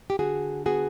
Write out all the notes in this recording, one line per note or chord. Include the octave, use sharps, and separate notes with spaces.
G4
D3 F#4 G#4
B3 F#4 G#4